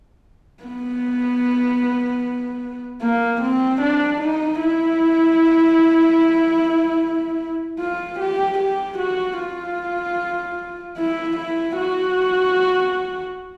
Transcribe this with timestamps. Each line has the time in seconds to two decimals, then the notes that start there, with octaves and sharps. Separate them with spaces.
0.64 B3
3.01 A#3
3.42 C4
3.81 D4
4.21 D#4
4.61 E4
7.78 F4
8.19 G4
8.58 G4
8.99 F#4
9.39 F4
10.97 E4
11.37 E4
11.77 F#4